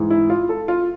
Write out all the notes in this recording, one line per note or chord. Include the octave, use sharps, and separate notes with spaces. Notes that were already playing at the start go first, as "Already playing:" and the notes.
Already playing: G#2 E3
E4
F4
A4
F4